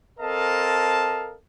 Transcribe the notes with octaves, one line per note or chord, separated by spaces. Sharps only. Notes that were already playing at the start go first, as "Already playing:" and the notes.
C4 A4 A#4 D#5 F5 A5